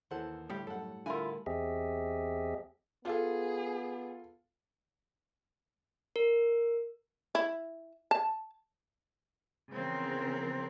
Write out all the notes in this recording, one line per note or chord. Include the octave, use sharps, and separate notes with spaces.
D#2 E3 A4 C5 F#5
A2 D3 G3 G4
F#2 A4 F#5
D3 E4 F4 A#4 F#5 G#5
E2 C4 G4 G#4 D#5 E5
B3 F4 G#4 A4
A#4
E4
A5
C#3 E3 F3 B3 C4 A#4